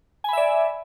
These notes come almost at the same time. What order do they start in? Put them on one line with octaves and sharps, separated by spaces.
G#5 B5 E5 D5